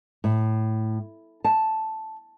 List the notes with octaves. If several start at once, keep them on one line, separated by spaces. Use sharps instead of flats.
A2
A5